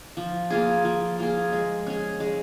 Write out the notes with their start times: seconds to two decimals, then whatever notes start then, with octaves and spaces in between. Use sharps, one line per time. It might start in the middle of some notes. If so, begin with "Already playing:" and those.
0.17 F3
0.50 A#3 F4 G#4
0.85 F3
1.18 A#3 F4 G#4
1.53 G#3
1.87 C#4 G#4
2.20 G#3